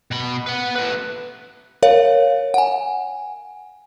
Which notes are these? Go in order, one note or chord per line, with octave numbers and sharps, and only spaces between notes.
B2 B5
B4 F#5
A3 B4
A#4 C#5 F5
F#5 G#5